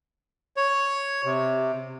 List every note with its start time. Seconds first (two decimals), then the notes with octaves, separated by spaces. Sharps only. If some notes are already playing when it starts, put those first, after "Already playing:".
0.56 C#5
1.25 C3